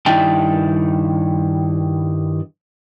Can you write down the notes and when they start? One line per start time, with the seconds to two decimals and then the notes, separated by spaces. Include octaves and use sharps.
0.06 G2 D#3 D4 E4 G5 A5